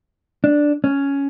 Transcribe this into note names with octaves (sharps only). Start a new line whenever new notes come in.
D4
C#4